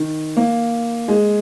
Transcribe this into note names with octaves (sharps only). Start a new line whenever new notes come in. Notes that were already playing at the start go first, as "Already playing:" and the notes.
Already playing: D#3
A#3
G#3